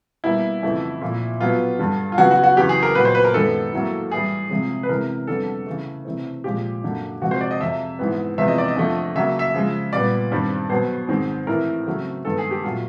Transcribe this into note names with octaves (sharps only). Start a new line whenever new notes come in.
B2 G3 A#3 E4
F2 C#3 E3 A3
A#2 F3 A3
B2 F#3 B3 F4
G2 D3 G3
F4
C#3 F#3 B3 F#4
F#4
F#4
E2 C#3 F#3 B3 G4
G#4
A#4
A#2 F#3 B3 B4
C5
B4
A#4
F#2 D#3 G#3 B3 A4
A2 F#3 A#3
A2 E3 G3 G#4
C3 F3 G#3 C4
B4
C3 E3 G#3 B3 A#4
F2 D3 G3 B3 A4
C#3 E3 A3
C3 E3 A3 C4
A#2 F3 G#3 G4
F#2 D3 F#3 A#3
C3 F3 G#3 C4 F#4
C5
D5
D#5
F2 C3 F3 E5
G#2 E3 G#3 B3
E2 C3 F3 G#3 B3 E5
D#5
D5
D#5
F2 D3 F3 A3
C#3 F#3 A#3 E5
E5
C#3 F3 G#3
A#2 G3 B3 D5
G2 D#3 G3 C4
B2 F#3 B3 C5
G#2 D#3 G#3 C4
A2 E3 A3 C4 A#4
C#3 F#3 A3 C4
G2 D#3 G#3 B3 A4
G#4
G4
A#2 F#3 A3 F4